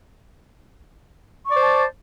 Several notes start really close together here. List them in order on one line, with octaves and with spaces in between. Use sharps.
C#6 D5 C5 A5